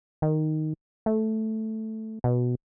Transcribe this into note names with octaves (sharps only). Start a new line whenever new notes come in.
D#3
A3
B2